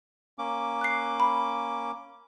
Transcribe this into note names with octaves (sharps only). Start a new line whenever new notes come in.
A#3 C#4 D6
F#6 C7
B5